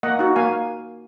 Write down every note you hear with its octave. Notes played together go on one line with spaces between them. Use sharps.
A#3 D#5 F#5
D#4 F#4
A#3 F5 G#5